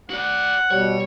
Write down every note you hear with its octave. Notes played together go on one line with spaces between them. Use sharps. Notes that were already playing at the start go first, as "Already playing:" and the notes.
F#4 D5 F#5
B2 G3 C#5